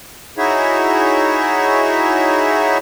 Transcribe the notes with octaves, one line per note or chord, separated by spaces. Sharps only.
D#4 E4 F#4 G#4 C#5 E5